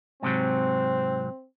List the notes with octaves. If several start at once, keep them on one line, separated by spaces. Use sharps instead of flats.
G#2 C3 F#3 C4